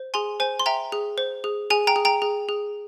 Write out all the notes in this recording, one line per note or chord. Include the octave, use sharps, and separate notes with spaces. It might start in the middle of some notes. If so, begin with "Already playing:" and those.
Already playing: C5
G#4 G#5 C6
C5 G#5
C6
E5 G5 A#5
G#4
C5
G#4
G#4 G#5
G5 A#5
G#4
G5 A#5
G#4
G#4